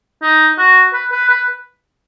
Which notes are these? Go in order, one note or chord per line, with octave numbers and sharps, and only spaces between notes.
D#4
F#4
B4
B4
B4